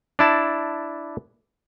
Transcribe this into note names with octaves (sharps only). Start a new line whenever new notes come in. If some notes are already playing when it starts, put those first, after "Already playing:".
D4 E4 A5